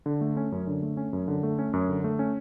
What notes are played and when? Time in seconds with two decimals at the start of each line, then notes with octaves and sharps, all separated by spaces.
0.06 D3
0.21 A3
0.37 C#4
0.52 F#2
0.67 D3
0.82 A3
0.97 C#4
1.13 F#2
1.28 D3
1.43 A3
1.59 C#4
1.73 F#2
1.89 D3
2.04 A3
2.19 C#4